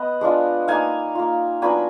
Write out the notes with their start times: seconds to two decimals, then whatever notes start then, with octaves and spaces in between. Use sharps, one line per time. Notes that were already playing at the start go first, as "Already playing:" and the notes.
Already playing: B3 B4 D#5 F#5
0.21 G#3 D4 F4
0.68 A#3 D#4 F5 G#5
1.15 A#3 F4
1.62 F#3 B3 D4 F4 G#5 B5